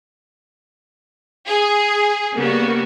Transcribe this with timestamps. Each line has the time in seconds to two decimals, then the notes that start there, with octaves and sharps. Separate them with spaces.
1.46 G#4
2.35 C#3 G3 A#3 B3 F#4